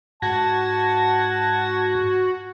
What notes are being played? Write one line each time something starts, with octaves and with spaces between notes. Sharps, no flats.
G#2 F#4 A5 G#6 A#6